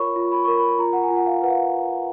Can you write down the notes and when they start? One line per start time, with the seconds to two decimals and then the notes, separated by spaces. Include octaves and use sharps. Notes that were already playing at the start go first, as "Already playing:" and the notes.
Already playing: F4 A#4 C#5 B5 C#6
0.16 F4
0.32 B5
0.44 A#4 C#6
0.58 B5
0.79 F4 A#5
0.93 F#5
1.03 G#5
1.10 F4
1.17 F#5
1.26 F5
1.42 B4 F#5
1.50 F5